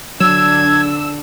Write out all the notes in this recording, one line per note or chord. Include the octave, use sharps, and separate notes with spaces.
D3 F#3 D4 E6 G#6